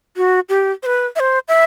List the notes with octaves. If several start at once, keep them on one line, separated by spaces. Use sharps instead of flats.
F#4
G4
C5
B4
E5
C5
E5